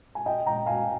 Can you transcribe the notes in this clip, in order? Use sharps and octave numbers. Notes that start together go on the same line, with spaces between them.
G#5
D#5 G5
G5 A#5
F5 G#5